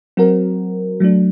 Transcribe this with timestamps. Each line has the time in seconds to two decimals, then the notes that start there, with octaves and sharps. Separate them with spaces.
0.17 F#3 C4 F#4 A#4
1.00 F#3 A3 D4